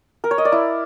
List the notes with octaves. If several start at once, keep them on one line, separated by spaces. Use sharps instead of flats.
A#4
C#5
D#5
D5
E4